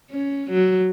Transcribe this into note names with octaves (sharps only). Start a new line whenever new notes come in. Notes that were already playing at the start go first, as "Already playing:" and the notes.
C#4
F#3